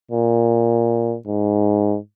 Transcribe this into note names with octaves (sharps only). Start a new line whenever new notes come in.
A#2
G#2